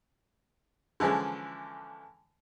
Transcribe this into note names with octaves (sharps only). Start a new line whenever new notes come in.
D3 E3 F3 G#3 C#4